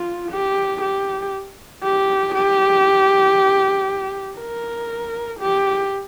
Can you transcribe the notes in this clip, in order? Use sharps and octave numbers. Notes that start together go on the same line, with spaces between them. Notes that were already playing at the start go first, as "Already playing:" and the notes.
Already playing: F4
G4
G4
G4
G4
A#4
G4